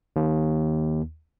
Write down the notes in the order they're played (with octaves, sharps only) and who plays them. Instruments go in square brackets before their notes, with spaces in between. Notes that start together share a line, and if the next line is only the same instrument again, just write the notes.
[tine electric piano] D#2